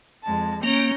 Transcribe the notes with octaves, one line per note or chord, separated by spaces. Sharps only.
F2 G#3 A5
A#3 C#4 A#5 G6